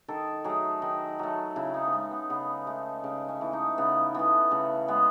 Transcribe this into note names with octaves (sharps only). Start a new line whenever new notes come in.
D#3 A4
F#3 A3 G#4
D#3
F#3 A3
C#3 E4
D#4
B3
G#3 C#4
B3
C#3 B3
G#3 A3
C#3
C#4
E3 A3
D#4
C#3 B3
E3 A3 B3
C#3 A3
G#3 B3